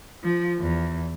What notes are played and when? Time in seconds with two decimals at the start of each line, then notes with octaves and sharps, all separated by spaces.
0.23 F3
0.59 E2